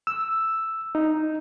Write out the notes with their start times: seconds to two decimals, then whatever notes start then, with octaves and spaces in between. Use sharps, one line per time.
0.07 E6
0.95 D#4